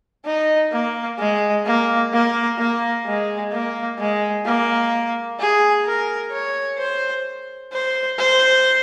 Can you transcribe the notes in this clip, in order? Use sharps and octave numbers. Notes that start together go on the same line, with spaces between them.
D#4
A#3
G#3
A#3
A#3
A#3
G#3
A#3
G#3
A#3
G#4
A#4
C#5
C5
C5
C5